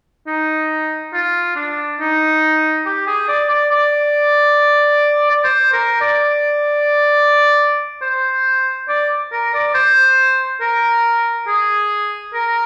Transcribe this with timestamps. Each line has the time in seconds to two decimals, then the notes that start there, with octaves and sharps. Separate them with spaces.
0.27 D#4
1.13 F4
1.56 D4
2.00 D#4
2.86 G4
3.07 G#4
3.28 D5
3.50 D5
3.72 D5
5.30 D5
5.44 C5
5.73 A#4
6.01 D5
8.02 C5
8.89 D5
9.32 A#4
9.54 D5
9.74 C5
10.61 A#4
11.47 G#4
12.34 A#4